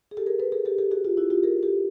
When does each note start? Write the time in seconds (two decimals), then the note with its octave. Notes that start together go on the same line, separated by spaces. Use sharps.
0.11 G#4
0.17 G4 A4
0.26 G#4 A#4
0.39 A4 B4
0.52 G#4 A#4
0.65 G4 A4
0.78 G4 A4
0.91 F#4 G#4
1.05 F4 G4
1.17 E4 F#4
1.30 F4 G4
1.43 G#4 A#4
1.63 G4 A4